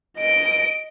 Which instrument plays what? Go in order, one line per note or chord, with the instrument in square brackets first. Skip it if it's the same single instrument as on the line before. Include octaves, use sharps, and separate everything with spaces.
[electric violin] D#5 D7